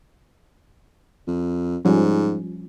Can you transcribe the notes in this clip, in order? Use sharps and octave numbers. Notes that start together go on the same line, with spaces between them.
F2
G#2 F3 G3 C#4